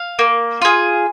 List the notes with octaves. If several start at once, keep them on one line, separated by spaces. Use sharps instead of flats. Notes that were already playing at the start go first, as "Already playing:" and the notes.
Already playing: F5
A#3
F4 G#4